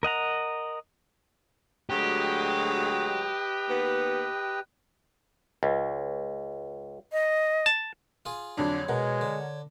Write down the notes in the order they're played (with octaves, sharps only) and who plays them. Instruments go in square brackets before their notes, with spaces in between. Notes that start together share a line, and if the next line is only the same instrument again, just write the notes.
[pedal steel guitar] A#4 D#5 F#5 A#5
[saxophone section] D2 F#3 G#3 [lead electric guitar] G4 [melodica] B4 D#5 G5
[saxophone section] D#2 B3
[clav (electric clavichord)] C#2
[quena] D#5
[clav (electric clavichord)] A5
[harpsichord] F4 G#4
[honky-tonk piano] F2 D3 F#3 [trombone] D4 [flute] C#5
[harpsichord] B2 [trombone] G#3 [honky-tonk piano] A#4 F#5
[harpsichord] D3